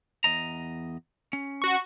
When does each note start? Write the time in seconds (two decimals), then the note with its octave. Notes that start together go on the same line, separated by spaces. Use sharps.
0.24 E2 D#5 A#5
1.33 C#4
1.62 F#4 C#6